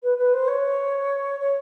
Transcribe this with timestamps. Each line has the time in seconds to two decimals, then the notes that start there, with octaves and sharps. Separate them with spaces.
0.03 B4
0.17 B4
0.33 C5
0.47 C#5
1.40 C#5